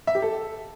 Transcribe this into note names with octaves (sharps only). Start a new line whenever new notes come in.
E5
G4
A4